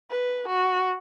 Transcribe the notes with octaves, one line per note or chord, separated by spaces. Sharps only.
B4
F#4